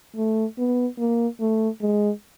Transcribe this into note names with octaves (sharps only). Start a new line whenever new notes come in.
A3
B3
A#3
A3
G#3